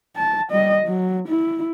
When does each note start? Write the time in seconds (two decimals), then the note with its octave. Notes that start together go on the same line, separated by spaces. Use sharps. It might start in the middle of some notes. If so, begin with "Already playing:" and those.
0.16 A5
0.51 G3 D#5
0.86 F#3
1.27 E4